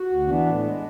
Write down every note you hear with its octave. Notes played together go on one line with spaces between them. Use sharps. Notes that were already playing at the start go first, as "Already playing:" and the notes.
Already playing: F#4
D2
E3 B3 D4
A2
G#3